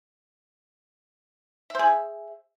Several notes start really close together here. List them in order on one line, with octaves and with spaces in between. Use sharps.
E5 C5 G#4